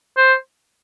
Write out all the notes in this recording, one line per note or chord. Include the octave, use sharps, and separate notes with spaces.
C5